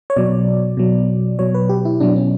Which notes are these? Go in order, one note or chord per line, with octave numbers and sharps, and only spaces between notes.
C#5
B2 F#3 D5
B2 F#3
B2 F#3 C#5
B4
G4
E4
B2 F#3 D4
C#4